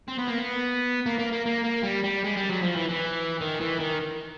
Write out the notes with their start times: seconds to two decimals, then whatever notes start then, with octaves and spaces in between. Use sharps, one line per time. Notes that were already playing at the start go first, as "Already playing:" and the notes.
0.08 C4
0.19 B3
0.28 A#3
0.38 B3
1.06 A#3
1.19 A#3
1.32 A#3
1.46 A#3
1.64 A#3
1.84 G3
2.04 G3
2.24 G#3
2.36 G3
2.49 F#3
2.62 F3
2.76 E3
2.89 E3
3.41 D#3
3.60 E3
3.79 D#3